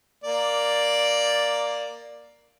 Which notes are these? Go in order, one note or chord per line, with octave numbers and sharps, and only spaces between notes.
A#3 D5